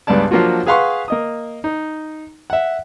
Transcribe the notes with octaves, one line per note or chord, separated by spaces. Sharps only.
C#2 G2 B3 D5 A5
F3 F#3 A#3 D4 F4 F#4
G#4 B4 F5 F#5 C6 C#6
A#3 D#5 D#6
D#4
E5 F#5